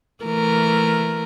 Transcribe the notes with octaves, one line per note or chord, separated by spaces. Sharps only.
E3 A3 A#4